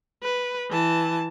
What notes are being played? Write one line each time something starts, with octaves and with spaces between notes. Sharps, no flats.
B4
E3 A5